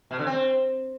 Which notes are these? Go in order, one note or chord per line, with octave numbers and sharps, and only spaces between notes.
B2
D3
C4